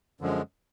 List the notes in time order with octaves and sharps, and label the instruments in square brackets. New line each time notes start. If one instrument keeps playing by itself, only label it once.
[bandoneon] F#2 D3 F3 G#3